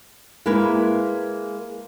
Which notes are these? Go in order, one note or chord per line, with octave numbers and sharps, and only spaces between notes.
G#3 A#3 E4 A#4 B4